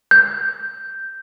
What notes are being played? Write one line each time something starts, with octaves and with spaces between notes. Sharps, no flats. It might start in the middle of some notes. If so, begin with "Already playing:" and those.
G6